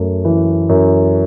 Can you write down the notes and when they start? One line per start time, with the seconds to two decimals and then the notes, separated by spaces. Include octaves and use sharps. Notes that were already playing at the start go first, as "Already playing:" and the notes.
Already playing: F#2 A3
0.25 E3
0.69 F#2